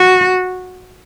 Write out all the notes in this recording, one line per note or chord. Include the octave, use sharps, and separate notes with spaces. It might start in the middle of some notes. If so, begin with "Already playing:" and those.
Already playing: F#4